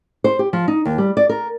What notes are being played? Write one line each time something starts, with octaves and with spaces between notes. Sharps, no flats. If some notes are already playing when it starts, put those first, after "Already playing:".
C5
G4
F3
D#4
D#2
G3
D5
A#4